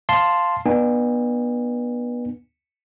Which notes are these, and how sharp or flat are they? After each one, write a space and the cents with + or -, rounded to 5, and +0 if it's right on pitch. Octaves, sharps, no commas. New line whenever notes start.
F5 +0 A5 +0 C6 +0
B3 -25 D4 +40 G#5 -35